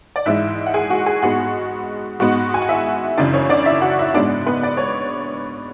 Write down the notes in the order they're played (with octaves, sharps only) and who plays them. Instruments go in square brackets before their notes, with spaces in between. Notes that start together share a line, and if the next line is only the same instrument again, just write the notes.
[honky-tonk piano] D5
G#2 E3 G#3 E4 E5
F#5
G#4 G#5
F#4 F#5
G#4 G#5
G#2 G#3 B3 F#4 F#5
G#2 G#3 B3 F#4 F#5
G#5
F#5
E4 E5
F#2 C#3 E3 D4 D5
C#4 C#5
D4 D5
E4 E5
F#4 F#5
E4 E5
G#2 G#3 B3 D4 D5
B3 B4
D5
C#5